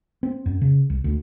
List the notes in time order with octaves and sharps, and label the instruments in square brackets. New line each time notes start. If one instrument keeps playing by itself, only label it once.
[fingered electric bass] C4
F#2
C#3
C2
D2